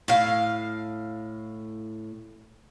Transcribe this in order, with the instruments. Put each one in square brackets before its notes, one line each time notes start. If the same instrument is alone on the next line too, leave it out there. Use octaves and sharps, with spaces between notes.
[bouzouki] A2 F5